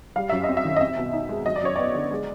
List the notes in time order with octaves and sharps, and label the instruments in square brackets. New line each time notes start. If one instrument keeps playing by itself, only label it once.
[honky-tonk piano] G3 F5
F#2 E5
D#5
C4
E5
D#3
D#5
C4 E5
B2
D#4
G#3
F#3 D#5
D5
F#2 C#5
B3 D5
D3
G#3